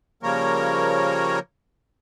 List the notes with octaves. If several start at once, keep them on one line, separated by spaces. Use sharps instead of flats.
C#3 F3 G3 A#3 A#4 C#5